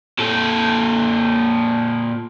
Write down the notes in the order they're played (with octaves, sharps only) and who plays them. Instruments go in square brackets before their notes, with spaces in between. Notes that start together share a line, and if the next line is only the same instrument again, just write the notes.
[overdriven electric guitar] A#2 A4